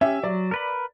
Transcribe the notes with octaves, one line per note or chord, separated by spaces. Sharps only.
C#4 G4 E5
F#3 D5
A#4 B4 B5